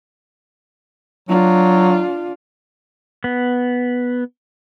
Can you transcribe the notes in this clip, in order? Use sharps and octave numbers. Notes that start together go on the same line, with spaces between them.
F#3 D4 F4
B3